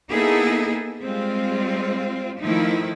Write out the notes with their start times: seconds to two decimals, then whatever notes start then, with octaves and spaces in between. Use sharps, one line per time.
0.11 A#3 B3 D#4 E4 G#4 A4
1.01 G3 G#3 C4 F4
2.39 D#3 F3 A3 D#4 E4